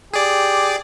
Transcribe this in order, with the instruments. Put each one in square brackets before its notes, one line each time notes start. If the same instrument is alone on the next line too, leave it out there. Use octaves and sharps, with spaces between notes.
[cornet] G4 [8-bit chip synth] G#4 D5